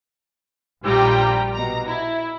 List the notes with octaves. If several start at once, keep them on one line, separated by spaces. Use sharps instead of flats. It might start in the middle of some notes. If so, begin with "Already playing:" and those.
A#1 G3 F4 G4 G5 A#5
B2 A#5
E4